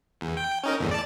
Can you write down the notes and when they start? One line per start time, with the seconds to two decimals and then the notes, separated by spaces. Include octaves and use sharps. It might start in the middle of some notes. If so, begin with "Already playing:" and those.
0.21 E2
0.37 G5
0.64 C#4 D#4 A#4
0.79 G1 E2 A2
0.91 D5 A5